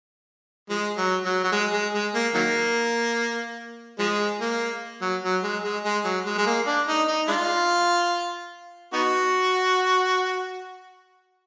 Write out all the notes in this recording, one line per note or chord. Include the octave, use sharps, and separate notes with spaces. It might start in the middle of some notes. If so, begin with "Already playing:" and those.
F3 G#3
F#3
F#3
F#3
G#3
G#3
G#3
A#3
D#3 F#3 A#3
F3 G#3
A#3
F#3
F#3
G#3
G#3
G#3
F#3
G#3
G#3
A#3
D4
D#4
D#4
G#3 D4 F4
B3 D#4 F#4